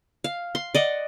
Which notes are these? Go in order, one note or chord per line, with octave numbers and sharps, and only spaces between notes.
F5
C6
D5 D#5 F#5